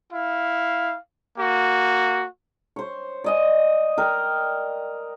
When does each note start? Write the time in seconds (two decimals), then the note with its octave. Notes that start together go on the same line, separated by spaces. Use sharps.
0.11 E4 F5
1.35 A#3 F#4
2.76 C5 C#5
3.24 D5 D#5 G#5
3.98 A#4 G5